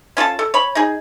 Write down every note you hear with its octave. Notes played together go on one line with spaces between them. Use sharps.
C#4 F4 A4 A5
A4
C#5 B5
D#4 G#4